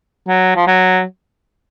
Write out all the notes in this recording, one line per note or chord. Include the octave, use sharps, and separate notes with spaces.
F#3
F3
F#3